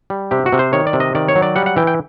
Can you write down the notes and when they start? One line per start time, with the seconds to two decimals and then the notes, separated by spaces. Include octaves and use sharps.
0.10 G3
0.31 C3 G4
0.46 F#4
0.52 C3
0.59 C5
0.73 D#3 C#5
0.87 D5
0.93 C3
1.00 D#5
1.15 D#3 D5
1.28 C#5
1.36 F#3
1.42 D5
1.56 G3 F#5
1.66 F#5
1.77 E3 G5
1.87 G5